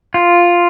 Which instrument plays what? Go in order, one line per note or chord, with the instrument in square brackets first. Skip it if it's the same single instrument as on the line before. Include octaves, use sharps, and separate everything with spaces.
[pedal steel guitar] F4